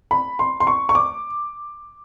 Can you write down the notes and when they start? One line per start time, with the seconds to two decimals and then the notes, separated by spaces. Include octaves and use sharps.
0.11 B5
0.39 C6
0.60 C6
0.67 C#6
0.89 C#6
0.95 D6